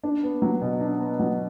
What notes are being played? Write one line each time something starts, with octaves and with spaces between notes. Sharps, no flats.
D4
B3
F#3
B2
D4
B3
F#3